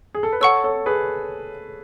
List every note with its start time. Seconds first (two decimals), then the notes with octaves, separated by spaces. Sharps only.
0.15 G#4
0.23 A4
0.33 B4
0.41 A4 C#5 F#5 C#6 E6
0.64 A4 C#5
0.86 G#4 B4